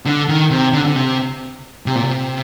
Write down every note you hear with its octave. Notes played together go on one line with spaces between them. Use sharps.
D3
D#3
C3
D3
D3
C3
C3
A#2
C3